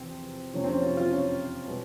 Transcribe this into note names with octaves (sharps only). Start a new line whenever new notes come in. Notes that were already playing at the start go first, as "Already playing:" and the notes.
Already playing: E2 C3 F3 C4
F2 C3 F3 A#3 C#4
C4
C#4
F4
F4
C#4
B2 G#3 B3